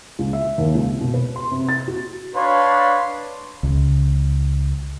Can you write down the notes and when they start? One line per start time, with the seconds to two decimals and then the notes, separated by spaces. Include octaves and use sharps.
0.19 C#2
0.33 E5
0.58 D#2
0.75 C#2
0.89 C3
1.01 B2
1.14 B4
1.36 C6
1.51 C3
1.69 A6
1.88 F#4
2.35 D4 B4 C#5 F5 C6
3.63 C#2